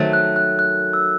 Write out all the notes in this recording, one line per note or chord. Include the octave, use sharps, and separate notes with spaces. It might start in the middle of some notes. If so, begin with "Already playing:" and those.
Already playing: D#3 F#3 A3
F#6
F#6
F#6
E6